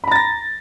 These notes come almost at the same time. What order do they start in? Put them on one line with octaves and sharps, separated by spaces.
B5 A#5 A6 A#6